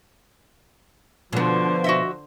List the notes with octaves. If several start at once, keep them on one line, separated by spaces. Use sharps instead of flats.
B2 D3 F3 B3 C5
F#4 D#5 E5